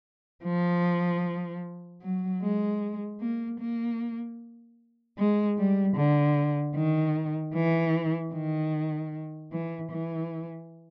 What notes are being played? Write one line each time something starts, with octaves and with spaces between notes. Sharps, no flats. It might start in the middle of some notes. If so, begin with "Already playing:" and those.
F3
F#3
G#3
A#3
A#3
G#3
G3
D3
D#3
E3
D#3
E3
E3